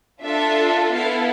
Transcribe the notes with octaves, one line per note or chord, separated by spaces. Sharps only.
D4 F4 A4 E5
B3 E4 A4 F5